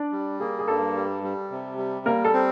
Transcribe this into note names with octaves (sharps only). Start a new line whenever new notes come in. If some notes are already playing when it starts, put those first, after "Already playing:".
Already playing: D4 D5
G3
A#3 G#4
G#4
G2 A4
G3
G3
C3
G3
G3 A#3 A#4
A4
C4